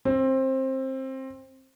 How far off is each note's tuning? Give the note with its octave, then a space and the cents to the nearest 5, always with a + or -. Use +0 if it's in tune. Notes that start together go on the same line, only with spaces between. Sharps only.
C4 +20